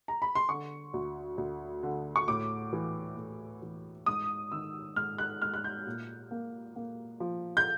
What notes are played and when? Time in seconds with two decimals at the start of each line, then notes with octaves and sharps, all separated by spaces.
0.08 A#5
0.22 B5
0.35 C6
0.49 D3 C#6
0.94 D2
1.38 D2
1.83 D3
2.16 C#6
2.28 A2 D6
2.73 E3
3.17 A2
3.62 E3
4.06 G#2 D#6
4.52 D#3 E6
4.96 G#2 F6
5.18 F#6
5.42 G#2 F6
5.54 F#6
5.64 G6
5.86 A#2
6.31 A#3
6.76 A#3
7.20 F3
7.57 G6